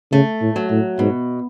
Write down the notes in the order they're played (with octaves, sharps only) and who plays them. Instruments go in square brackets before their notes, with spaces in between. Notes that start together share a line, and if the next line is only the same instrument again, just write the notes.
[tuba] C#3 [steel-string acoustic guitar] A3
[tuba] A2
[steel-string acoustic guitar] F#3
[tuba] A2
[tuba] G#2 [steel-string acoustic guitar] B2